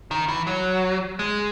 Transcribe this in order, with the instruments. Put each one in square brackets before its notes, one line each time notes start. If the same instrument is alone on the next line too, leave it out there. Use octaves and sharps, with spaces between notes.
[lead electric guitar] D#3
E3
F#3
G#3